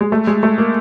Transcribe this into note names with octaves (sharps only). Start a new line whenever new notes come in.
G#3
A3
G#3
A3
A#3